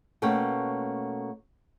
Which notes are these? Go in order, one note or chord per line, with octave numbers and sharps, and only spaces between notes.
B2 A3 A#3 C#4 F#5 G5